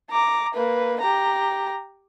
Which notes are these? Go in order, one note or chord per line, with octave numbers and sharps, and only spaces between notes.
A#5 D6
A#3 B4
G4 A#5